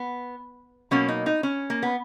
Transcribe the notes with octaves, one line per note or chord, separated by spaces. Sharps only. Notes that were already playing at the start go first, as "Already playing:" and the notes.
Already playing: B3
B2 F#3 A#3 C#4
D#4
D#4
C#4
A#3
B3